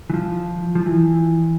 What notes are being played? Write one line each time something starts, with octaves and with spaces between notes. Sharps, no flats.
E3
F3
F3
E3